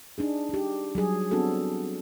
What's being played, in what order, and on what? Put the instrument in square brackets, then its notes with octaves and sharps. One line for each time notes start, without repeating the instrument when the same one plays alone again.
[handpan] D4 D#4 G#4
D#4 G4
F#3 G3 G#4
B3 C4 D4 F#4 A4